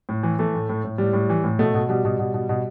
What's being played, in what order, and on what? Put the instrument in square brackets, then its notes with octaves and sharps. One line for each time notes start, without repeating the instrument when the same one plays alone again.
[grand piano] A2
E3
E3 A3
A2
A2
A2
A2 G3
A2
E3
A2
B2 A3
B2
B2 G3
B2
B2
B2
B2